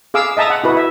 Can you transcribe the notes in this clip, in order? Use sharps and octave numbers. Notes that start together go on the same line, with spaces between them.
G#4 F5 D6 E6
D#5 E5 A5 A#5 D#6
F#5
E4 F#4 B4
E5